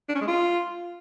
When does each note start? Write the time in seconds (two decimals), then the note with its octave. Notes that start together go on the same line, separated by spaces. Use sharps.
0.09 D4
0.15 C#4
0.21 G#3
0.27 F4